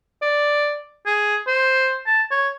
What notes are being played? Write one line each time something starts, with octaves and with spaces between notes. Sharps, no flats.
D5
G#4
C5
A5
C#5